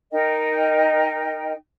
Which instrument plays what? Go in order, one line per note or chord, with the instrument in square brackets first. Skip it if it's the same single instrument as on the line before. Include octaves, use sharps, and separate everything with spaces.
[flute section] D#4 A#4 D#5 G5